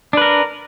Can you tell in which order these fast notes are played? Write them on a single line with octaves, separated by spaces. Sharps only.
D4 B4 A#4